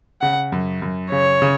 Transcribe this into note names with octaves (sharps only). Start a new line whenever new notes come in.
C#3 F#5
F#2
F#2
C#3 C#5
C#3